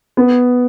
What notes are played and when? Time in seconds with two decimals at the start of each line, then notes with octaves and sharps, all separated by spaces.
0.17 B3